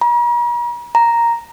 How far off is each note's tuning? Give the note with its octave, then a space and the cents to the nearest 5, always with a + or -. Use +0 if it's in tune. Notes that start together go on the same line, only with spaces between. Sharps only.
A#5 +45
A#5 +0